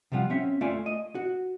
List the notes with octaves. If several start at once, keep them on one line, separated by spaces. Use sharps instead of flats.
C3 F3 G3 F4 F#5
C4 C#4 E5
A3 F4 D5 G#5
D#5
F#4